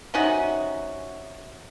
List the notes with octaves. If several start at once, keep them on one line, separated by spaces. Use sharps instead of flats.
C3 C#4 D#4 F#4